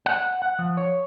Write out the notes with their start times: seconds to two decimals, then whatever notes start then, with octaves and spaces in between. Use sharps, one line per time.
0.06 F#5
0.42 F#5
0.59 F3
0.77 C#5